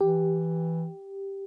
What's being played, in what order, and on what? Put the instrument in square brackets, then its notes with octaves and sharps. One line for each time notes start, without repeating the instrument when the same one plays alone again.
[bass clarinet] E3 [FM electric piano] G4